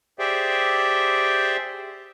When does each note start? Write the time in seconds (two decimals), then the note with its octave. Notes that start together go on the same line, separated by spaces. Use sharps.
0.19 G4 G#4 C5 D5 E5 G5